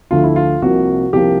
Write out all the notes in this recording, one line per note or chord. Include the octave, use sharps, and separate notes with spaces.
D2 D3 F3 A3 F4
E4
F4
C2 C3 F3 A#3 F#4
C2 C3 F3 A#3 G4